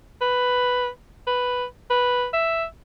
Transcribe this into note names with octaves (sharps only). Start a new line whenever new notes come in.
B4
B4
B4
E5